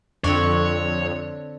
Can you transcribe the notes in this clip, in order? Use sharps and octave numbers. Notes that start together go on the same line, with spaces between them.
F2 D3 C4 D4 C#5